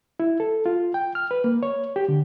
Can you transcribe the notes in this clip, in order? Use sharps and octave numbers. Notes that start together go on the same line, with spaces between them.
E4
A4
F4
G5
F6
B4
A#3
C#5
G4
D3